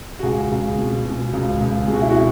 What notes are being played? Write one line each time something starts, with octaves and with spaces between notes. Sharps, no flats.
F#4
C#2 G#4
C#2
B2
B2
C#2
C#2
B2 G#4
F#4
E4
B2 F#4